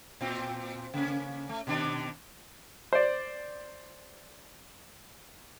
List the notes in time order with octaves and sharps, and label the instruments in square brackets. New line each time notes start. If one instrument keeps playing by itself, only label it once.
[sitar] A#2 C4 F4
C#3 A#3 C#4
A3
B2 D#3 D4
[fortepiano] C5 D5